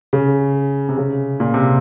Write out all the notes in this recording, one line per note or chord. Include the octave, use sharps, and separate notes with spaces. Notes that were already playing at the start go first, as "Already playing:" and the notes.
C#3
C3
C#3
A#2
C3